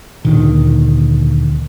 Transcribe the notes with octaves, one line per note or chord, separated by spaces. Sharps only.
D2 A#2 D3 D#3